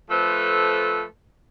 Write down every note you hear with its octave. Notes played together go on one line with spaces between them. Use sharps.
F3 A3 A4 B4 C5